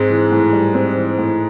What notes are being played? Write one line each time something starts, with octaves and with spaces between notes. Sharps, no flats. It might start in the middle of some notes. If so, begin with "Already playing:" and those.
Already playing: G#2 G#3 C4
E3
A2
G3
C4
E3
A2